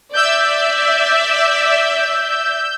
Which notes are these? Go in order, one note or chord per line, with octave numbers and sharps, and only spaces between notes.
D5 E5 E6 G6